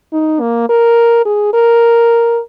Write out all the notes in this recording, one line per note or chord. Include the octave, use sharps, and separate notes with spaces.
D#4
A#3
A#4
G#4
A#4